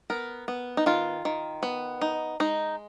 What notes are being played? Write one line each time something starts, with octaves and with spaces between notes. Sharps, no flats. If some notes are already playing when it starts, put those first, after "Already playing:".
B3 A#4
B3
D#4
D#3 F4
D#3
B3
D#4
G#3 D#4